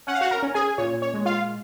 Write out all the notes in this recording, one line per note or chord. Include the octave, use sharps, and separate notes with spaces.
C#4 F#5
F5
F#4 F#5
A#4 A#5
C#4
G#4 G#5
A#2 C#5
C#5
G#3
F4 F5